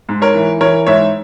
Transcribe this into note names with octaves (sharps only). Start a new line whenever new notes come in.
G#2
A#4 C#5
E3
E3 A#4 C#5
G#2 C#5 E5